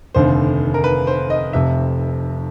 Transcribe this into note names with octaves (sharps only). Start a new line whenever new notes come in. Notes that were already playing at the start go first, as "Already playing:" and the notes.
F1 D#2 D3 C5
A#4
B4
C5
D#5
F1 F2 C3 E5